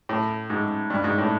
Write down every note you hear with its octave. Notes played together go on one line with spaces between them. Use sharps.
A2
G#2
G2
G#2
A2